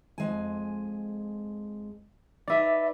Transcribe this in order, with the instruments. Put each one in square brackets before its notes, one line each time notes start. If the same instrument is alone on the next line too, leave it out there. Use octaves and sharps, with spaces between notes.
[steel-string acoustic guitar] F2 G#3 G#5
[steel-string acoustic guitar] D#4 B4 [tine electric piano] D5 E5